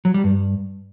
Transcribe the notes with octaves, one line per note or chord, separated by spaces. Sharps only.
F#3
G3
G2